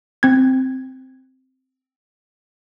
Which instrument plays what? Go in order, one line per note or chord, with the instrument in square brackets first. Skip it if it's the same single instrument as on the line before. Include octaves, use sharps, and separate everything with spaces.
[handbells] C4 G#6